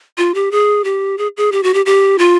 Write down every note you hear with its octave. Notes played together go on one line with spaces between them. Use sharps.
F4
G4
G#4
G4
G#4
G#4
G4
F#4
G4
G4
F4